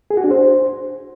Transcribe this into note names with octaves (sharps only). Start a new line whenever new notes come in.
G#4
F#4
D4
C5